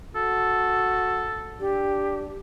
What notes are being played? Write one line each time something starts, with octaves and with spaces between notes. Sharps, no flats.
F#4 A4
D4 G4